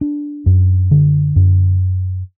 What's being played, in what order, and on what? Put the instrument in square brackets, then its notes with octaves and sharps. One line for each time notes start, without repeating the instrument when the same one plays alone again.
[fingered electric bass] D4
F#2
D3
F#2